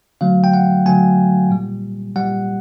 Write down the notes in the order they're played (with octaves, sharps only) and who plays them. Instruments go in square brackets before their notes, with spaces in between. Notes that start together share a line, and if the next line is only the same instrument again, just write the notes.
[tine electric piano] D3 F#3 A3 F5
G5
F#5
D3 F#3 A3 G#5
A#2 G3
A#2 G3 F#5